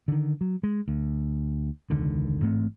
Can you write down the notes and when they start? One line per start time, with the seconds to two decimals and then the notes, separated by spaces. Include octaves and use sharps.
0.08 D3 D#3
0.41 F#3
0.63 G#3
0.88 D2
1.90 E1 C#2 D3 D#3
2.41 A1 G#2 A3 C4